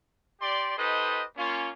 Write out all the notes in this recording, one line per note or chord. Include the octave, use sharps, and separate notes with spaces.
G4 D5 C6
D#4 G4 A4 B4 C5 D#5
A#3 C#4 F4